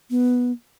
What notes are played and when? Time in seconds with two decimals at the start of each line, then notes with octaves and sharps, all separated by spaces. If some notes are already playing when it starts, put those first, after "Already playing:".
0.10 B3